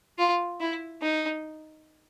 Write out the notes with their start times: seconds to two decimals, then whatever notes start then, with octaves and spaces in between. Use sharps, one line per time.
0.18 F4
0.60 E4
1.02 D#4